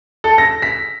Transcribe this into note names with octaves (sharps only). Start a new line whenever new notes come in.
A4
A#6
B6